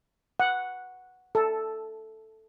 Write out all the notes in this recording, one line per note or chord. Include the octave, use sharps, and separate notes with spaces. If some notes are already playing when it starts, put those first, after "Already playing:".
F#5
A4